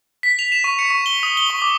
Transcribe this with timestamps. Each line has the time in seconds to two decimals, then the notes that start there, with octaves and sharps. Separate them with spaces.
0.23 B6
0.39 F7
0.52 E7
0.64 C#6
0.79 C#7
0.90 C#6
1.06 G7
1.23 D#6
1.37 G7
1.50 C#6
1.62 D6